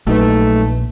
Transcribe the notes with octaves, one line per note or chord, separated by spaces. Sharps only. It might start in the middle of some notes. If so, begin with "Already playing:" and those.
A#1 F#3 A3 D#4 B4